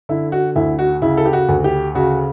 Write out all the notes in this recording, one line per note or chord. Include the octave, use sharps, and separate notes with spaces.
D3 E4
F#4
D2 E4
F#4
C#3 E4
A4
G4
F#4
D2
G4
C#3 F#4